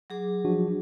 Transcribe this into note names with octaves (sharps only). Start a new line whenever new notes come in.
F#3 G#4 D6
F3 D4 F#4